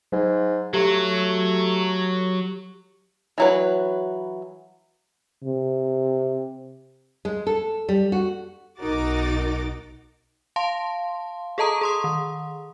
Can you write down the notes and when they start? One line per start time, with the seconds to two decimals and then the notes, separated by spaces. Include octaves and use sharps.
0.12 G#2 F#3
0.74 F#3 A3 G4
3.38 E3 F#3 B4
5.44 C3
7.25 G#3
7.47 A4
7.89 G3
8.12 F#4
8.79 B1 D#4 F#4 A#4 D6 A6
10.56 F5 A5 C6
11.58 G#4 A4 D#5 A5 A#5 D#6
11.81 G#4 C6 D#6
12.04 D#3